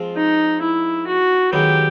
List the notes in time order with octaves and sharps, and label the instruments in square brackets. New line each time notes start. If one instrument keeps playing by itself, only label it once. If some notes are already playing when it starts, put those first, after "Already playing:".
Already playing: [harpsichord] F3 G#3 C4 F4
[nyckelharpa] D#4
E4
F#4
[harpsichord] F#2 D#3 G#3 B3 [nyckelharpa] G4